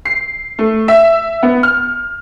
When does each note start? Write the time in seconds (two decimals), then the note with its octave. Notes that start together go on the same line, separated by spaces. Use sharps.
0.05 C7
0.59 A3
0.88 E5
1.43 B3
1.63 F6